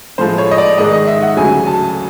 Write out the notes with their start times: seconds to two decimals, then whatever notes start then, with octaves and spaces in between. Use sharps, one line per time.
0.18 A2 F3 G#3 C5
0.38 C#5
0.51 D#5
0.58 D5
0.78 G#2 D#3 G#3 D#5
0.93 D#5
1.07 E5
1.22 F#5
1.37 D2 C#3 F#3 G#5
1.67 A5